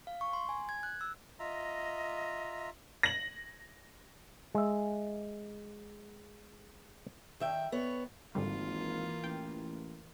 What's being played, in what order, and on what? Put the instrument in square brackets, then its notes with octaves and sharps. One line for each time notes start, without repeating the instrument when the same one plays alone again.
[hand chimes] F5
C#6
C6
G#5
G#6
F#6
E6
[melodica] F4 E5 A#5 [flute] D#5
[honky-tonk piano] A#6 F#7
[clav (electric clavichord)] G#3 E5
[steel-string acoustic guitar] D#3 E5 G5
B3 C#5
[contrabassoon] G#1 [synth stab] G#2 D3 G3 [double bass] E3 A#3 [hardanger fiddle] F4
[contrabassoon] A1 [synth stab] G5